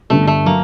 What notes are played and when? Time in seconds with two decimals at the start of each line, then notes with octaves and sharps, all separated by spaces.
0.10 G1 G2 D3 A3
0.27 A3
0.45 F#3 A#3